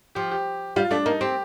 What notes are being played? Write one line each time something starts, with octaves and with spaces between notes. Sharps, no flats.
F3 G4
G4
G3 F4
A3 D4
A#3 D#4
C4 G4